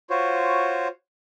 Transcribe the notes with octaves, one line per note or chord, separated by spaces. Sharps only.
F4 F#4 C5 C#5